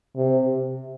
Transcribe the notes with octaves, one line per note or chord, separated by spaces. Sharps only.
C3